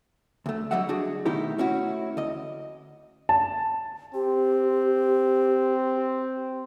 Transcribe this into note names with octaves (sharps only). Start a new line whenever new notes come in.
D2 A3
D3 F#3 G3 D#5 E5 F#5
D4 F#4 G#4
B2 D#3 A3 D#4 E4 G4
A3 C#4 E4 F#4
D2 D#5
A5
C4 G4